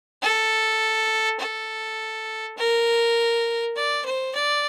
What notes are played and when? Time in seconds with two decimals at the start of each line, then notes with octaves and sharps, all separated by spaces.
0.22 A4
1.40 A4
2.57 A#4
3.76 D5
4.05 C5
4.35 D5